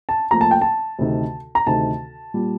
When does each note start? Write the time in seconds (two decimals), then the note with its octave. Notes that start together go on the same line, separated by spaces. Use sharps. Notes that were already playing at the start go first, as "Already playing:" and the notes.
0.09 A5
0.31 A#2 F3 A3 A#5
0.41 A5
0.51 G5
0.62 A5
0.99 D2 C3 D#3
1.55 A#5
1.66 D2 C3 D#3 A5
2.34 A#2 G3